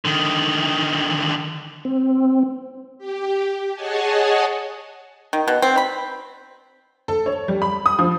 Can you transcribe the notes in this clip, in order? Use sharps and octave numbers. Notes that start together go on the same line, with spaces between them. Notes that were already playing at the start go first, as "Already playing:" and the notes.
D3 D#3
C4
G4
G#4 C#5 D#5 F#5 G#5 A5
D#3
B2
C4
B5
A4
C#5
G3
B5
D#6
F3